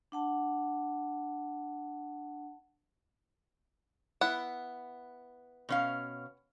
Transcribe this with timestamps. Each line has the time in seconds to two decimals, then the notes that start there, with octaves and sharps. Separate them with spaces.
0.12 D4 F#5 A5
4.21 B3 E4 F#5
5.69 B2 C#4 F5